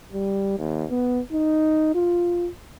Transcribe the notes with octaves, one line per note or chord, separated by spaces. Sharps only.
G3
D#2
B3
D#4
F4